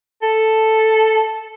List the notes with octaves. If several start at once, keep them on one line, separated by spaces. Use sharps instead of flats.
A4